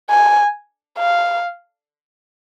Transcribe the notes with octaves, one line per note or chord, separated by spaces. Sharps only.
G#5
F5